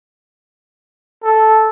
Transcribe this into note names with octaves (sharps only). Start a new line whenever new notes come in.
A4